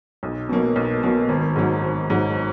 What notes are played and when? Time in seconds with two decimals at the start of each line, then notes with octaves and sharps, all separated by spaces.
0.23 B1
0.49 B2 F#3 A#3
0.76 B1
1.03 B2 F#3 A#3
1.29 G#1
1.56 G#2 F#3
1.83 G#1
2.10 G#2 F#3